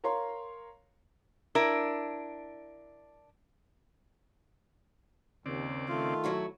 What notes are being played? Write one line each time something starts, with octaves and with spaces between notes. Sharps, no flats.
A#4 C#5 F5 A#5 C6
D4 E4 A#4
D#2 C#3 C4 D5
D#3 A3 F4
F#3 E4 F#4